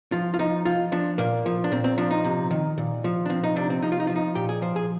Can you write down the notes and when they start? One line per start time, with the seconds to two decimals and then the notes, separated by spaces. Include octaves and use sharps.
0.12 F3 F4
0.34 F4
0.39 F3 D#4
0.65 F3 F4
0.92 F3 D4
1.18 A#2 A#3
1.46 F3
1.64 D4
1.72 A#2 C4
1.84 C4
1.98 F3 D4
2.11 D#4
2.24 C3
2.51 D#3
2.78 A#2
3.04 F3
3.26 D4
3.30 F3 C4
3.43 D#4
3.56 C3 D4
3.70 C4
3.82 F3 D#4
3.92 F4
4.00 D#4
4.07 F3 F4
4.16 D#4
4.35 A#2 G4
4.49 G#4
4.62 F3 C5
4.76 G#4